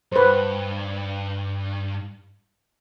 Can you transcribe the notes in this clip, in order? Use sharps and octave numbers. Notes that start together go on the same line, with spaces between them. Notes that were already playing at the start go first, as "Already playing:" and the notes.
G2 B4 C5